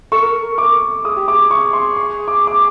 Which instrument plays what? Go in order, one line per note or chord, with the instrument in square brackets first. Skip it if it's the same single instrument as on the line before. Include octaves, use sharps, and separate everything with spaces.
[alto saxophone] A4 [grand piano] C#6
[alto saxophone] A#4
A4
A#4
A4
[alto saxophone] A#4 [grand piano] D6
[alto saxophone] A4
[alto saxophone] G#4 [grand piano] D#6
[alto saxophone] G4
[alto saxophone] G#4 [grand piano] D6
[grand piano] C#6
C6
C#6
D6
D6